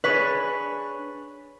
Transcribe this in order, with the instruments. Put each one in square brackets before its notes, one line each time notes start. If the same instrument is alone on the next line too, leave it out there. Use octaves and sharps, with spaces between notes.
[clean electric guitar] D4 G#4 C#5 [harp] B4